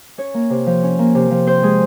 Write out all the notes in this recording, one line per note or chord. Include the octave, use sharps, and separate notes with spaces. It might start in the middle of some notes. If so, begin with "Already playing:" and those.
C#4 C#5
A#3
C3
F3
C#4
A#3
C3
F3
C4 C5
G#3 G#4